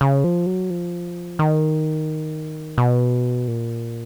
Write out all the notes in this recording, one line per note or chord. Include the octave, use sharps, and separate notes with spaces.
C#3
F3
F#3
F3
D#3
B2
A#2